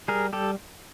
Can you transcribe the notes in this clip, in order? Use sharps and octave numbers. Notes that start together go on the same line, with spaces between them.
G3 G#4 A#4
G3 G4 A4